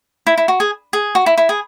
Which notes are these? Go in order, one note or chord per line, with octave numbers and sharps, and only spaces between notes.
E4
E4
F#4
G#4
G#4
F#4
E4
E4
G#4